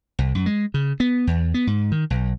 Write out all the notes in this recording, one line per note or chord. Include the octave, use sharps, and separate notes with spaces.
C2
F#2
G#3
C#3
B3
E2
B3
G#2
D#3
B1